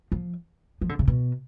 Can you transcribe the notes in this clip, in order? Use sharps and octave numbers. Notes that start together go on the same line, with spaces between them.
F3
F3
D3
C#3
B2